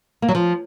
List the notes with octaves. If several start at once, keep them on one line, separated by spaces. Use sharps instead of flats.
A#3
F#3
F3